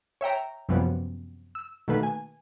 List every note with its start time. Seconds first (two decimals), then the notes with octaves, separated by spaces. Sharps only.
0.21 C#5 E5 G5 A#5
0.69 F#2 C3 F3 G3 B3 C#4
1.55 E6
1.88 B2 D#3 A3 A#3 B4
2.03 G#5